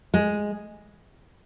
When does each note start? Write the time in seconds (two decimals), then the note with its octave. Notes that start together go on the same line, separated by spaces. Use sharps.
0.14 G#3